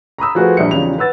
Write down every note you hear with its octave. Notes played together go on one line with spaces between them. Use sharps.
A#5 B5 D#6 E6
F3 A3 F#4 G#4 B4 C5
A#1 G3 E5 C#7
E2 C#3 F3 G3 D#4 F7
B4 F#5 E6 A6